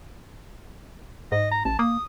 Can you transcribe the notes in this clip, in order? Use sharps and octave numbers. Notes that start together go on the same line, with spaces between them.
G#2 D#5
A#5
A1 A5
A#3 D#6